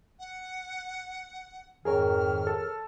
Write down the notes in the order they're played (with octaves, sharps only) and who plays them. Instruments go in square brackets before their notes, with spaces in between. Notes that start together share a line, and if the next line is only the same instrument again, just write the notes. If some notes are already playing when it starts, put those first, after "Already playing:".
[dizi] F#5
[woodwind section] F2 G#2 D#3 [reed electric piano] G#4 A#4 C#5 [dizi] F6
[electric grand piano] A4